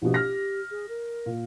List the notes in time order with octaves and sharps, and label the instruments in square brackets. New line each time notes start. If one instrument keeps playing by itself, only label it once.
[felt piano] A#1 B2 [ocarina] G4
[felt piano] F6 A#6
[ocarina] G#4
A#4
[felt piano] A#2